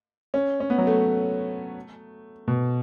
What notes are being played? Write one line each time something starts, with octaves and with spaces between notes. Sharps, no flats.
C#4
C#4
B3
F#3
A3
B2